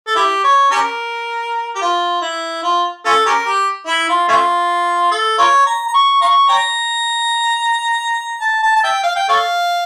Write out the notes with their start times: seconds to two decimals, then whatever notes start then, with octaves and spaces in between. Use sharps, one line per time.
0.07 A4
0.16 E4 G4
0.44 C#5
0.71 C#4 G4 A#4
1.76 G4
1.82 F4
2.22 E4
2.63 F4
3.05 C#4 F4 A4
3.26 C#4 G4 A#4
3.46 G4
3.87 E4
4.08 F4
4.28 A3 C#4 F4
5.11 A4
5.38 F4 A#4 C#5
5.66 A#5
5.88 A#5
5.94 C#6
6.22 F5 A#5 C#6
6.49 C#5 G5 A#5
8.41 A5
8.63 A5
8.76 A5
8.84 E5 G5
9.03 F5
9.16 G5
9.29 A4 C#5 F5